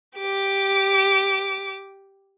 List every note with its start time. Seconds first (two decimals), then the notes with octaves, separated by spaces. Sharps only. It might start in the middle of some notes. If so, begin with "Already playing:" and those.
0.18 G4 D6